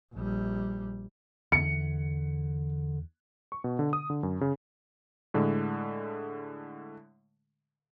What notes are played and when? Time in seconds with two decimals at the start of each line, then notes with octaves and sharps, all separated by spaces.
0.14 A#1 G3
1.52 E2 D3 C#7
3.52 C#6
3.64 B2
3.79 D3
3.93 D#6
4.10 D3
4.23 F#2
4.41 C#3
5.34 A2 D3 G#3